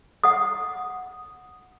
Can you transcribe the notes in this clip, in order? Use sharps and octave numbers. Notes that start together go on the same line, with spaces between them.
F#5 D#6